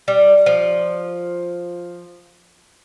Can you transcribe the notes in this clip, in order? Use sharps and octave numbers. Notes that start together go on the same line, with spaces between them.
G3
F3